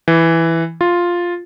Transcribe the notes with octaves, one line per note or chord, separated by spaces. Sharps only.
E3
F4